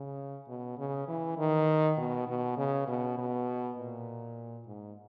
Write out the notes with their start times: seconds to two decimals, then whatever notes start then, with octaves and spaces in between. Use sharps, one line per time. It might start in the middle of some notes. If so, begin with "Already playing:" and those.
Already playing: C#3
0.48 B2
0.78 C#3
1.08 E3
1.38 D#3
1.98 B2
2.27 B2
2.57 C#3
2.88 B2
3.18 B2
3.78 A#2
4.67 G#2